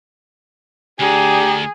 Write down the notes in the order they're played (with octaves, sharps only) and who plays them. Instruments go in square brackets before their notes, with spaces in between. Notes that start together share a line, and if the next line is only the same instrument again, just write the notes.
[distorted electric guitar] D2 [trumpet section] D4 G4 A#5 [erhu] G#4